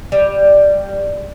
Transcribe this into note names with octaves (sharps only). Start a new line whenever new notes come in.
G3